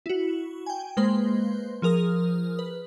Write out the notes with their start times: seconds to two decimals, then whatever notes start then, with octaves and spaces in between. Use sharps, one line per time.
0.06 E4 F#4
0.66 G5 G#5
0.97 G#3 A#3 B4 C5 C6
1.82 F3 G#4 A#4 D#6 F6
2.59 B4